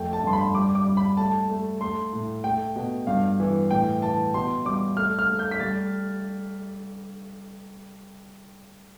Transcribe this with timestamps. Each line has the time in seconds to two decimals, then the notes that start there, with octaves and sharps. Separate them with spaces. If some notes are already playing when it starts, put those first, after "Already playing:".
Already playing: F2 A3 G5
0.13 A5
0.24 G2 C6
0.33 B5
0.54 G3 D6
0.75 D6
0.86 G3
0.97 B5
1.17 A3 A5
1.49 A3
1.81 A3 C6
2.13 A2
2.44 A3 G5
2.76 B2
3.07 G2 F5
3.40 E3
3.71 A2 G5
4.02 E3 A5
4.34 B2 C6
4.65 G3 D6
4.97 A3 F6
5.19 F6
5.29 A3
5.39 G6
5.51 B6
5.60 G3 A6